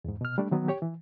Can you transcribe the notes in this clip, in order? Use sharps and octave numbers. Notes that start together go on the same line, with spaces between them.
E2 G#2
B2 F6
G3 A3 D4
D#3 F#3 B3
G4 C#5 G5
E3